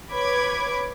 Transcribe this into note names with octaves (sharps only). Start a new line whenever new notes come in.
B4 C#5 B5 D6 G#6